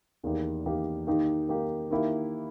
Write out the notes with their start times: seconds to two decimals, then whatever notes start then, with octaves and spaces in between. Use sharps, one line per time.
0.23 E2 D#3 A#3 D#4 G4
0.66 E2 D#3 A#3 D#4 G4
1.07 D#3 A#3 D#4 G4
1.49 D#3 A#3 D#4 G4
1.91 D#3 A#3 E4 G4